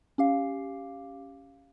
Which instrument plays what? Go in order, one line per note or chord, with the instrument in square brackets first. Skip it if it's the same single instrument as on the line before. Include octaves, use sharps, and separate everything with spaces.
[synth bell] C#4 G4 F5